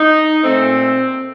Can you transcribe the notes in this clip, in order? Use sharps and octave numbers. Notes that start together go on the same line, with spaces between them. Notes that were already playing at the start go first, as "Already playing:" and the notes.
Already playing: D#4
A#2 A3 C4